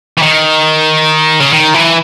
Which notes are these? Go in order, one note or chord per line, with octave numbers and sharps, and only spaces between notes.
E3
D#3
C#3
D#3
E3